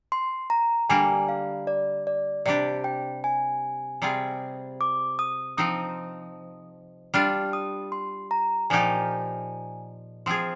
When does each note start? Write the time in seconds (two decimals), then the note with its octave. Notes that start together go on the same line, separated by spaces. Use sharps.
0.12 C6
0.50 A#5
0.89 D3 G3 A#3 G#5
1.29 F5
1.67 D5
2.07 D5
2.46 C3 G3 D4 G4 D5
2.84 G5
3.24 G#5
4.02 C3 G3 C4 F4 G#4
4.81 D6
5.19 D#6
5.57 F3 C4 D#4 D#6
7.14 G3 D4 F4 F6
7.53 D#6
7.92 C6
8.31 A#5
8.70 A#2 F3 A#3 D#4 G4 G#5
10.26 F3 C4 F4 G#4 C6